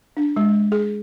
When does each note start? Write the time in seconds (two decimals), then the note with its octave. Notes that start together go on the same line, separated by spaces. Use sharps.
0.17 D4
0.36 G#3
0.72 G#4